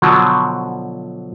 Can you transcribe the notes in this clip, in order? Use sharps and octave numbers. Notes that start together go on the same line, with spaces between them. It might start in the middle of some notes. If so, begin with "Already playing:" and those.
B2 D3 F3 F#3